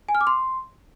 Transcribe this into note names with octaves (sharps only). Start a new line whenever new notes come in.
G#5
F6
D6
C6